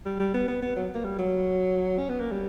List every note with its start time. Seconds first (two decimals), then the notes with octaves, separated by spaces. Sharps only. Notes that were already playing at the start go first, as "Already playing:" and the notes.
0.06 G3
0.20 G3
0.34 B3
0.48 B3
0.62 B3
0.76 F#3
0.94 A#3
1.05 G3
1.18 F#3
1.98 C#4
2.09 B3
2.20 A#3
2.32 G3